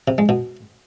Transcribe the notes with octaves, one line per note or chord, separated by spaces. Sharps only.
C3
G#3
B2